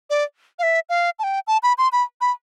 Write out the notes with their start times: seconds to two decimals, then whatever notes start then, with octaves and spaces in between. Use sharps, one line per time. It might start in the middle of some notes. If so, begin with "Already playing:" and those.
0.10 D5
0.59 F5
0.63 E5
0.89 F5
1.19 A5
1.24 G5
1.47 A5
1.63 B5
1.78 C6
1.92 B5
2.21 B5